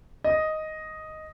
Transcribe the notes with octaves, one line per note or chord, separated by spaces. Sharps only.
D#5